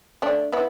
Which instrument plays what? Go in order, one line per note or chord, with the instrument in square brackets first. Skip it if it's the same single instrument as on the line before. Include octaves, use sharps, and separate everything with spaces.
[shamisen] A3 D4
B3 E4